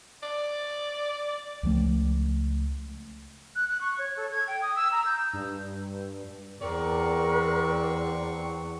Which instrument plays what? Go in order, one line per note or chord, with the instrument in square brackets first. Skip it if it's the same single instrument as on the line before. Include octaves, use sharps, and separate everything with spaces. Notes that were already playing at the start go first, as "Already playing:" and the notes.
[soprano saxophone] D5
[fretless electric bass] C#2 F3 A3
[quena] F#6
F#6
C#6
C#5
A4
G#6
G5
D#6
E6
A#5
G6
[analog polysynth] G2
[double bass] E2 [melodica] C4 C#6 [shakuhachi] A#4 [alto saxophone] D5